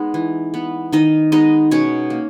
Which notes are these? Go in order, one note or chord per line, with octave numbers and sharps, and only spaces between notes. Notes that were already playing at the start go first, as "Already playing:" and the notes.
Already playing: G#3 B3 D#4
E3
B3
D#3 D#4 D#5
G#3 B3 D#4 D#5
B2 C#4 C#5
A#3